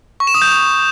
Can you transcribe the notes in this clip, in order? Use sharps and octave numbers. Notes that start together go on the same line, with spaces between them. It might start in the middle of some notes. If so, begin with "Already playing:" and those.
C#6
E7
D#6
G6